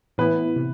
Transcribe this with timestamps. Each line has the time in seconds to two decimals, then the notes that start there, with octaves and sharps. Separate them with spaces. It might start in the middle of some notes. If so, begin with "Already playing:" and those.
0.18 A2 E3 B3 E4 B4
0.56 C3